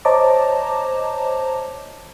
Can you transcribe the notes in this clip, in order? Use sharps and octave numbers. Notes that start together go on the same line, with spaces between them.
C5 C#5 D#5 A5 A#5 D6